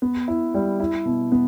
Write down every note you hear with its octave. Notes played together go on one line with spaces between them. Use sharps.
B3
E4
G3
E4
B2
B3